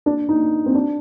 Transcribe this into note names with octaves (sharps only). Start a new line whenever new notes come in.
D4
D#4
C4
D4